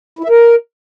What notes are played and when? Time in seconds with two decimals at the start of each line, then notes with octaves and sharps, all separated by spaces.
0.19 E4
0.24 E5
0.29 A#4